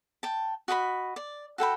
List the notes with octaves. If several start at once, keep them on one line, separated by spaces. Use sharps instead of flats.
G5 A5
F#4 D#5 A5 B5
D5
F#4 A4 G5 B5